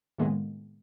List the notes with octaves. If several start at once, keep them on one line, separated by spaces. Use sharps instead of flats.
A2 C3 D#3 G#3 A#3 B3